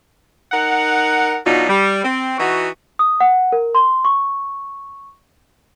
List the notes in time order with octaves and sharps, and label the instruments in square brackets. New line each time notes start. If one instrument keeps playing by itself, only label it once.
[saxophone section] D#4 A#4 F#5
B2 F#3 D4 D#4 F4
G3
C4
E3 D#4 F#4
[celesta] D#6
F#5
A#4
C6
C#6